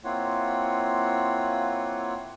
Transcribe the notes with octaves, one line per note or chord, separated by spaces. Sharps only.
A#3 C4 E4 F4 C#5 F#5